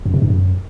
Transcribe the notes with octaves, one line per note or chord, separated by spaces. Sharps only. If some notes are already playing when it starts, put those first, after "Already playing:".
F#2
C3
G2
F#2